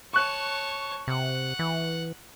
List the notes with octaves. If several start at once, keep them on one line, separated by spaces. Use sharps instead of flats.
C#5 A5 C#6 F#6
C3 F#5
E3